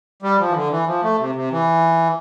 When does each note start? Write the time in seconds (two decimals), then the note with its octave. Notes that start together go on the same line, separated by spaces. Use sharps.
0.22 G3
0.39 F3
0.49 E3
0.54 D3
0.71 E3
0.87 F3
1.02 A3
1.19 C3
1.35 C3
1.51 E3